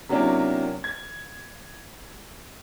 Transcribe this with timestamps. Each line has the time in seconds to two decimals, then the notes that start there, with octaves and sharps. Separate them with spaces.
0.09 C3 F#3 A#3 C#4 D4 E4
0.84 G#6